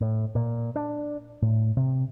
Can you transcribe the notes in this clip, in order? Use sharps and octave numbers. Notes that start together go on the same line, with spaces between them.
A2
A#2
D4
A2
C3